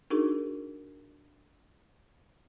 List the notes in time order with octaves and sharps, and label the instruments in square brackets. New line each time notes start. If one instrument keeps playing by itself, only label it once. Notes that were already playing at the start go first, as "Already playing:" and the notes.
[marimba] D4 D#4 F#4 G#4 A#4